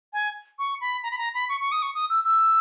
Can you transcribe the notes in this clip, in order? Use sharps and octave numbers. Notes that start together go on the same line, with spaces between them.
G#5
C#6
B5
A#5
B5
A#5
B5
C#6
C#6
D#6
C#6
D#6
E6
E6